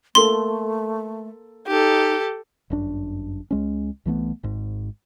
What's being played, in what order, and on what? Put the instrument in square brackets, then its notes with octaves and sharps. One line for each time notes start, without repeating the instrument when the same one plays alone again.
[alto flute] A3 [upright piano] A#3 A4 [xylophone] C6
[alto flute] D#4 [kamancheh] G4 A4
[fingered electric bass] G1 F#2 D4
C#2 G#3 C#4
C2 E3 A3 B3
G#1 G#2